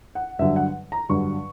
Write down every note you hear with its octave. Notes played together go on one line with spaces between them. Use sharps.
F#5
G2 D3 F#3 E5
F#5
A#5
G2 D3 F#3 C#6